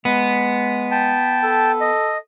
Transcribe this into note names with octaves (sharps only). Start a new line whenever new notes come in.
G#3 B3
G5 A5
A4
D#5